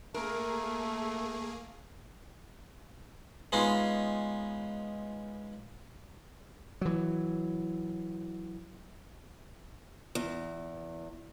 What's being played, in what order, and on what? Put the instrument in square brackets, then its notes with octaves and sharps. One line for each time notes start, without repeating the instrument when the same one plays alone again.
[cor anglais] A3 [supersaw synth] A#3 G#4 [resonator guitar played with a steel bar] A#4
[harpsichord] G#3 B3 C#4 D#4 F4
[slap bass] E3 F#3
[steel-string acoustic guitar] E2